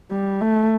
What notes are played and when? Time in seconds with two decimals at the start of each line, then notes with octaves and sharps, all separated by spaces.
0.11 G3
0.41 A3